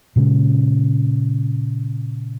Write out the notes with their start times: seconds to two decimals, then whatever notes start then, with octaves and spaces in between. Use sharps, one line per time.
0.16 A#2 C#3 G#3 C#4